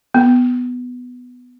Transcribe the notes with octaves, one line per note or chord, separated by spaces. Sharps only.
B3